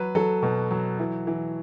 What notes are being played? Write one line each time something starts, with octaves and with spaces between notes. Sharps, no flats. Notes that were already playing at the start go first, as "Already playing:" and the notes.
Already playing: F#3 B4
F#3 A4
B2
F#3
E3
E3